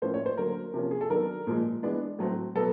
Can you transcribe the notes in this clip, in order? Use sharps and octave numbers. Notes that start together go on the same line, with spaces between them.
A2 F3 A#3 C#4 C5
C#5
C5
D3 F#3 A#3 A#4
C3 F3 A#3 C#4
G#4
A4
D#3 F#3 B3 D4 A#4
A#2 F3 G#3
E3 G#3 B3 D4
A2 F#3 A3 C4
B2 F#3 B3 A4